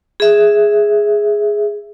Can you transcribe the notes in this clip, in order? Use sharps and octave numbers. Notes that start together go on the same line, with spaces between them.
G#4 E5